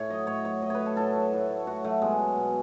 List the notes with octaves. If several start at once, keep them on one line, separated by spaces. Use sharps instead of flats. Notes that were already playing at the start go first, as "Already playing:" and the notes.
Already playing: A2 C#5
F#3 D#5
A2 C#5
F#3 C#5
A2 D#5
B4 C#5
F#3
A4
A2 A4
F#3
A2
F#3
A2 F#4
F#3 A3
B2 G#3
F#3
B2